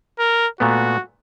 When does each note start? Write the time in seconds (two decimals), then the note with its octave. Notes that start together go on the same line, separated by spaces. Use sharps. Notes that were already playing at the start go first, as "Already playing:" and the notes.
0.19 A#4
0.60 A#2 A3 B3 F#4